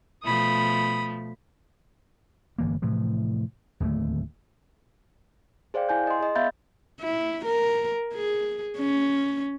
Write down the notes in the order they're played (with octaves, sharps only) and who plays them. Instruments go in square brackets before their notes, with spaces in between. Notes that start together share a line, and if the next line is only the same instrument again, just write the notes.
[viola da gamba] B2 F3 A3 [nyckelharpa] B5 D#6
[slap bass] G1 E3 A#3
A2 C3 E3 F3
D1 D#2 D3 A3
[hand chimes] G#4 C5 D5 F5 G5
E4 G#5 G6
D#5 C6
G#4 D#5
B3 E5 F5 B5 G6 A6
[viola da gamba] E4
A#4
G#4
C#4